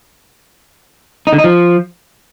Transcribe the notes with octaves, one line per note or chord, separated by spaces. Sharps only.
D#4
D3
D#4
F3